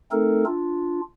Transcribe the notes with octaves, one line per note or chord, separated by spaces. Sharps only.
A3 C4 D#4 A4 A#4
D4 F4